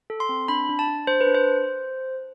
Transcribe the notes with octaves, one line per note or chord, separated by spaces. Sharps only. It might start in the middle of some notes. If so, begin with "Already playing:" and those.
A4
C6
C4
D4 B5
D4
A5
D4
D4 C5
B4
D4
C5